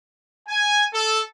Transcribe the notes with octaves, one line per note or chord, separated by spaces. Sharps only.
G#5
A4